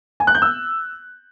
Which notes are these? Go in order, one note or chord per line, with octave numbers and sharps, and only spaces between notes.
G#5
F#6
G6
E6